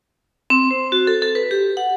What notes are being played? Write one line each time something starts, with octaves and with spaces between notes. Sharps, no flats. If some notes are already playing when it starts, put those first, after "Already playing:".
C4
C5
F#4
A4
A4
B4
G4
F#5